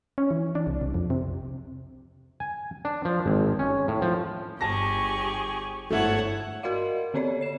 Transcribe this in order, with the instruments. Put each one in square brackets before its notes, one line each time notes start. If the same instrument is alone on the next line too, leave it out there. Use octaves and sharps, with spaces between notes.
[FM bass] C#4
E3
D4
C2
C2
F2
C3
[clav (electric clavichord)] G#5
D4
F3
G#1
C#4
A2
F3
[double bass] G1 [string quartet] G4 G#4 C#6 [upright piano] A5 A#6
[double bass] G1 G#2 [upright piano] A3 E4 [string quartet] C#5 F#5 A5
[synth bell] F#4 A#4 D5 D#5 F5
D3 A#3 C4 C#5 D5
C7 E7